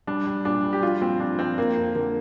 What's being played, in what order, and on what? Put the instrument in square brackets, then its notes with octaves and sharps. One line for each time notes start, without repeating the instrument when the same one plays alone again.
[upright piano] G3 D4
G3
A#2 D4
G3
G4
F3 F4
A#2 C4
F3 D4
F3 C4
F3 A#3
F2
D3 A#3